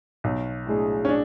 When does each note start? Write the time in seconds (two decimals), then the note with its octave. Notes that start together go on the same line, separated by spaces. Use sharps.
0.24 B1
0.66 A2 G#3 D4 G#4
1.05 C#4
1.09 D4